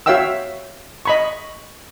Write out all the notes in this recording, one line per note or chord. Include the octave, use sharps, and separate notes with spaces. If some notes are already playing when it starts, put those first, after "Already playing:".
F#4 C#5 E5 F5 G5 E6
D#5 B5 C#6